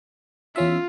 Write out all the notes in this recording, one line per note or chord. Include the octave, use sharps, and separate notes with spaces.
E2 C#4 F4 E5